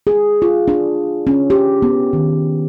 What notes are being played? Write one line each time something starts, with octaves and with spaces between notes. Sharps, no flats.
G#4
F4
D4
C#4
G4
B3
D#3